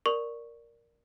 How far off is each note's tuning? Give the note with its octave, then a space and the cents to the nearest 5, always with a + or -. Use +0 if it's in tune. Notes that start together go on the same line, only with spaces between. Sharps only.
A#4 +0 D5 +0 C#6 +0